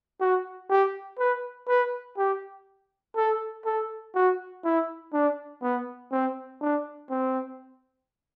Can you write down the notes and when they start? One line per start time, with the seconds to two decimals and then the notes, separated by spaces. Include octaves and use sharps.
0.21 F#4
0.70 G4
1.19 B4
1.68 B4
2.18 G4
3.16 A4
3.65 A4
4.15 F#4
4.64 E4
5.14 D4
5.63 B3
6.12 C4
6.61 D4
7.10 C4